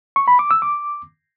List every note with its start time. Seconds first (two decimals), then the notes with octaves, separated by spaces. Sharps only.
0.16 C#6
0.28 B5
0.39 D6
0.51 E6
0.62 D6